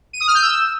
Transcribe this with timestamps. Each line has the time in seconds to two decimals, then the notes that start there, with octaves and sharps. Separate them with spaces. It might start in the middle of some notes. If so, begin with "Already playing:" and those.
0.13 D#7
0.21 D#6
0.28 F6
0.35 G6
0.42 E6